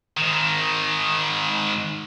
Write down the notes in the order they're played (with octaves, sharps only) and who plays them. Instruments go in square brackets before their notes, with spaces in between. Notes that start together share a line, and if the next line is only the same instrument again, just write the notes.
[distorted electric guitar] G#2 D#3